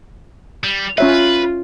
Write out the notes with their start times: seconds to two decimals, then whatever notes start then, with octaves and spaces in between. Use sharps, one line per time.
0.64 G3
0.98 C#4 F4 B4 C#5 E5